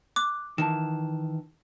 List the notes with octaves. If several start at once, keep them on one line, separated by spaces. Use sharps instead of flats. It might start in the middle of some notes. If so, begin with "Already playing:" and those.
D6 F#6
D#3 E3 A5 E7